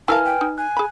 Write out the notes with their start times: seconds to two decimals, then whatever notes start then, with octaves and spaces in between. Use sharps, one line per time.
0.08 E4 A#4 B4 F5 G#5 A5 F6
0.25 G5
0.41 D#4
0.58 G#5 F#6
0.77 G#4 B5